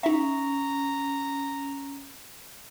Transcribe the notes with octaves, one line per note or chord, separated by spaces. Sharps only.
C#4 D#4 E5 A#5